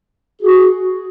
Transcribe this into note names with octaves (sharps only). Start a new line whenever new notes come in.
F#4 G#4